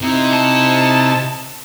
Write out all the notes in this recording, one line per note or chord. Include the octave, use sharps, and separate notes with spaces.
C3 D#4 E4
A5